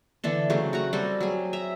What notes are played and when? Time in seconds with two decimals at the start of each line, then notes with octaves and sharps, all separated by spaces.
0.24 D3 E3 D4 A4
0.50 C#3 F#3 A3 C4
0.73 F#4 F#5 A#5
0.93 G3 C4 F#4 A4
1.21 F#3 G#4
1.53 E5 A#5